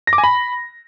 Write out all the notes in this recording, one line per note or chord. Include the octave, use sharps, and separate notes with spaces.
A#6
D6
G#5
B5